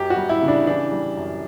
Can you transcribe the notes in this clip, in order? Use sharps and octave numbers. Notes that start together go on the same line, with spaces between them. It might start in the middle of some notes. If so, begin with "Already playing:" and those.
Already playing: F#2 G4
F#4
G3
E4
C#3
D4
E3 D4
G3
F#2